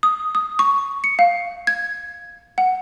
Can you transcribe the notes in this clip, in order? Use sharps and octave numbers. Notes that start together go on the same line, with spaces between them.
D#6
D#6
C#6
C#7
F5
G#6
F#5